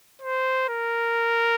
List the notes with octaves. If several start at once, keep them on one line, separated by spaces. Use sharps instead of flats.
C5
A#4